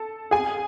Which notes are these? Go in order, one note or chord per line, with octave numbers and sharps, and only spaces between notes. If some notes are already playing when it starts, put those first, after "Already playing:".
Already playing: A4 A5
G#4 G#5